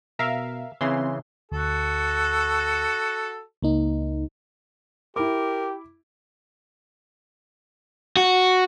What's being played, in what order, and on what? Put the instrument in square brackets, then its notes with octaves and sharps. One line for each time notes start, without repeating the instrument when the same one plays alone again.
[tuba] B2 [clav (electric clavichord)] A#4 [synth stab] E5 F5
[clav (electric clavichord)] C#3 E3 [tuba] C4 [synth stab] C6
[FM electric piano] D2 [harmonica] F#4 A4
[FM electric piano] C#2 A#3 D#4
[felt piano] E4 D6 [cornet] G4 [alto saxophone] A#4
[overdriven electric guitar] F#4